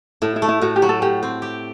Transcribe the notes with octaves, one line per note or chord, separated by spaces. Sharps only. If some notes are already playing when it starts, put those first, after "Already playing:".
A2 E4
E4
A3
E4
A2 F#4
G4
F#3
A4
A2 G4
C4
G4